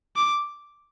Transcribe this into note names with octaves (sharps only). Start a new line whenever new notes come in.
D6